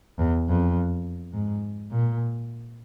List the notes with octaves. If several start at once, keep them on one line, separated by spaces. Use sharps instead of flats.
E2
F2
G#2
A#2